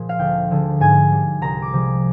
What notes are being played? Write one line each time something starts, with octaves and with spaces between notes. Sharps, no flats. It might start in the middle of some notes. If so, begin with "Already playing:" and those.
Already playing: A#2 F3 G#3
F5
D2 G5
D3 F3 G#3
G#2 G#5
G3
C2 A#5
D6
C3 F3 G#3